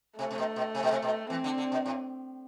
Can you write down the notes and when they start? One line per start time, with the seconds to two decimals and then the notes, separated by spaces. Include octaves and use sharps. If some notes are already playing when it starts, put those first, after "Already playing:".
0.19 C3 A3
0.31 C3
0.38 B2
0.56 B2
0.75 C3
0.83 B2
0.91 C3
1.02 B2
1.30 E3 C4
1.44 D3
1.58 D3
1.72 B2
1.86 A2